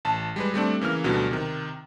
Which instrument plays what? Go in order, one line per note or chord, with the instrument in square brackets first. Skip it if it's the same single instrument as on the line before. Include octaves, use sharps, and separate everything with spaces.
[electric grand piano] A1 A5
G3 G#3 B4
G3 A3 C4 D4
C#3 E3 A#3 F6
D2 B2 D3 F#3 G3 B3
C3 D#3